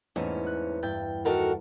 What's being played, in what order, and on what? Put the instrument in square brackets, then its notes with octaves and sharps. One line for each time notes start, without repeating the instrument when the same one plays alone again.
[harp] E2 A3 A#3 [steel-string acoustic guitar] G#2 C#4
[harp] F#6
[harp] G2 E4 A6 [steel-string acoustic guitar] G5
[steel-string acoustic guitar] D#3 A4 A#4 [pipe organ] F#4